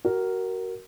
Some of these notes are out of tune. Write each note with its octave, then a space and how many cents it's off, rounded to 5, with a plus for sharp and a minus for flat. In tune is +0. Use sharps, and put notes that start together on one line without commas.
F#4 +25 A#4 +0